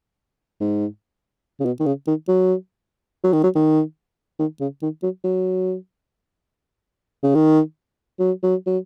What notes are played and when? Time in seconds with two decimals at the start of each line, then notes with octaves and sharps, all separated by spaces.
0.61 G#2
1.60 C#3
1.65 B2
1.80 D#3
1.86 C#3
2.08 D#3
2.28 F#3
3.24 F#3
3.33 D#3
3.44 F#3
3.55 D#3
4.39 D#3
4.61 C#3
4.82 D#3
5.03 F#3
5.24 F#3
7.23 C#3
7.35 D#3
8.20 F#3
8.43 F#3
8.67 F#3